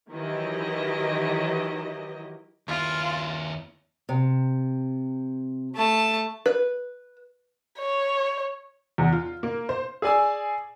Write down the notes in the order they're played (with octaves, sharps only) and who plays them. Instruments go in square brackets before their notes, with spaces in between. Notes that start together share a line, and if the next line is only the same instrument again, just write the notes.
[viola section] D#3 E3 F#3 E4 G4 D#5
[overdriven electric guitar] D#2 E4 [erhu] F4
[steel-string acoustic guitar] C3
[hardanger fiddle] A3 A5
[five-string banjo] B4
[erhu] C#5
[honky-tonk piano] E2
F4
A#3
C5
[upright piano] G#4 D5 G#5 E6